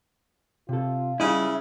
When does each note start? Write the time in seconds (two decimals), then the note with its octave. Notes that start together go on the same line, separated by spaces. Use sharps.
0.69 C3 F4 A4
1.20 C#3 G3 E4 G4 D#5